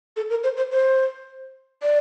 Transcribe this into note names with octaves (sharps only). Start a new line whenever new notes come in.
A4
A#4
C5
C5
C5
D5